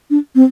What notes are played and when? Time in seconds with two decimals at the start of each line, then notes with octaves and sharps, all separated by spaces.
0.10 D4
0.35 C4